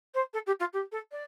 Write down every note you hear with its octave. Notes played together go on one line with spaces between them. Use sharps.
C5
A4
G4
F4
G4
A4
D5